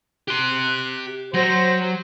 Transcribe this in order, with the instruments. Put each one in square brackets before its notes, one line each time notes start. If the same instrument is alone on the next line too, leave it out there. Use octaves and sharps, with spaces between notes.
[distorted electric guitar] G4 C6 [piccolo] F#6
[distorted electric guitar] F#3 [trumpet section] G4 C5 [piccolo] A#6